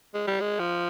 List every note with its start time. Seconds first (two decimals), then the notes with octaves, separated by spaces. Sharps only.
0.14 G#3
0.27 G3
0.40 G#3
0.59 F3